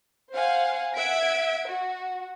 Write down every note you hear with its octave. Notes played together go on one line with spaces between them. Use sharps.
C5 F5 F#5 G#5
E5 F#5 G#6 B6 D7
F#4